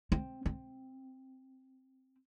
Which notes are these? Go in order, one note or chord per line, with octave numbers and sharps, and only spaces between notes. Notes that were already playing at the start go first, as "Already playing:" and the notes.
C4
C4